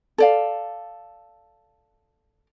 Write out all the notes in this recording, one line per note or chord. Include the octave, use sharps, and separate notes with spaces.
A4 D5 F5